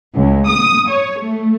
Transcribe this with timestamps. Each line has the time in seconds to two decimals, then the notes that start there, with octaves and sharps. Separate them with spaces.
0.15 C#2
0.47 D#6
0.89 C#5
1.19 A3